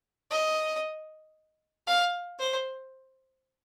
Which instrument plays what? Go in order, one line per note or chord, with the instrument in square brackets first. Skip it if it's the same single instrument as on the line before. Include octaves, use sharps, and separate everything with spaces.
[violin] D#5
F5
C5